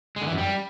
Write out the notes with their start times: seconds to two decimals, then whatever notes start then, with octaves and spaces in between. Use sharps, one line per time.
0.16 G#3
0.22 D3
0.27 E3
0.32 F#2
0.38 G3